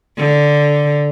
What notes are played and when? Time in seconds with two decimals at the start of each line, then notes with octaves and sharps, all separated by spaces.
0.18 D3